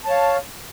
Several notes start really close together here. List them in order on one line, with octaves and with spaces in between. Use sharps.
A5 C#5 F5